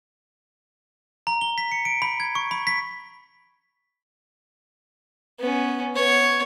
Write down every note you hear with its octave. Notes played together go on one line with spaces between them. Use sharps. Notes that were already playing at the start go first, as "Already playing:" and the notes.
A#5
G7
B6
C#7
D7
B5
G#6
C#6
B5
B6
B3 C#4
B3 C#5